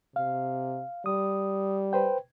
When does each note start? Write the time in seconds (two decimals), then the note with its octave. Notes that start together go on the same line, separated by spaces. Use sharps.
0.16 C3 F5
1.06 G3 D#6
1.93 B4 C5 G5